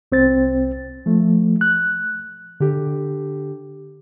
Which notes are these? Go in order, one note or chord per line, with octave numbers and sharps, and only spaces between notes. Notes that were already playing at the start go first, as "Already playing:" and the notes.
C2 C4 C5 A6
F3 A3
F#6
D3 G4